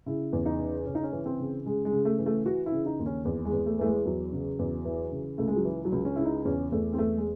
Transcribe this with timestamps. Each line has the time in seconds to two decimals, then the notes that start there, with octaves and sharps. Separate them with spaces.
0.06 C#3 E4
0.33 E2
0.46 D#4
0.59 C#3
0.86 C#3 C#4
0.95 D#4
1.03 C#4
1.12 E3
1.26 C4
1.39 C#3
1.66 C#3 G#3
1.85 G#3
1.92 C#3
2.05 A3
2.19 E3
2.26 A3
2.46 E3 F#4
2.66 E4
2.72 C#3
2.86 D#4
2.99 D#2
3.06 C#4
3.25 E2
3.45 G#3
3.53 E2
3.66 A3
3.79 E3 A3
3.85 G#3
4.05 E2 F#3
4.32 C#3
4.59 E2
4.85 E3
5.12 C#3
5.38 C#2 A3
5.48 G#3
5.56 F#3
5.65 E3
5.85 F#3
5.92 C#2
6.05 C#4
6.16 C#3 E4
6.25 D#4
6.45 E2 C#4
6.72 E2 A3
6.93 C4
6.98 E2 A3
7.17 G#3